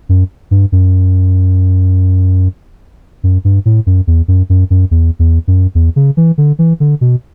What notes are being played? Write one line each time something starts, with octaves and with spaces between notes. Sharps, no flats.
F#2
G2
F#2
F#2
G2
A2
F#2
E2
F#2
F#2
F#2
E2
E2
F#2
E2
C#3
E3
D3
E3
D3
B2